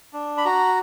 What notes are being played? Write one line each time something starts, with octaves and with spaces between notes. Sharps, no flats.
D4
B5
F#4 A#5